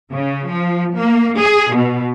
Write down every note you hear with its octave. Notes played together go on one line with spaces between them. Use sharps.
C#3
F3
A#3
G#4
B2